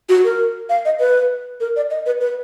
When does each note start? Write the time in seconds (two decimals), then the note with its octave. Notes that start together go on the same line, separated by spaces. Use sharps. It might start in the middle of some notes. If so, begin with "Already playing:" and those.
0.09 F#4
0.24 A#4
0.69 F5
0.85 D#5
0.99 B4
1.60 A#4
1.76 D5
1.90 D#5
2.06 B4
2.21 B4